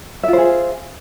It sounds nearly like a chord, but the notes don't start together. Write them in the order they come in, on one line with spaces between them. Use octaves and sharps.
E5 F4 C5 G#4